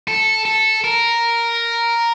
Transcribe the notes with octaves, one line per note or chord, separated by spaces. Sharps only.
A4
A4
A#4